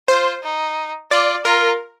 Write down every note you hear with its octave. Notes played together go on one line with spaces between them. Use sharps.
F4 C5
D#4
F4 D5
F4 A#4